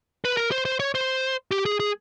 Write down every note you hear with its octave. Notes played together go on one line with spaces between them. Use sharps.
B4
A#4
C5
C5
C#5
C5
G4
G#4
G#4